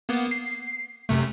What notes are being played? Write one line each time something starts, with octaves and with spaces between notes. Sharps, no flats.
A#3 B3
C7
F#2 C3 A3